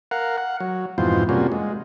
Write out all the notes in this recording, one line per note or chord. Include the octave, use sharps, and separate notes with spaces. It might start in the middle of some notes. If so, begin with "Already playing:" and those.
A#4 F5 F#5
F#5
F#3
F2 G#2 B2 E3 F4 C5
C3 G3 A#3 C#4 F4 F#4
G#3